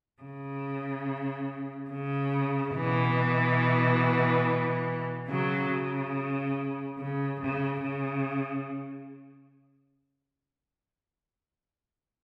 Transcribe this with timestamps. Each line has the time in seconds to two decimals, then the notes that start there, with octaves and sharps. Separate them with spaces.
0.21 C#3
1.91 C#3
2.74 B2 E3
5.28 C#3 F#3
5.71 C#3
6.97 C#3
7.39 C#3
7.82 C#3